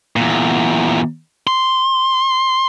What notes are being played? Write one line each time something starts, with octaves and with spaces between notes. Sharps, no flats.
E2 A#2
C6